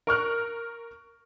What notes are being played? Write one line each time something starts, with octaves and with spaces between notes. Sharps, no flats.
A#4 C#6 F6 F#6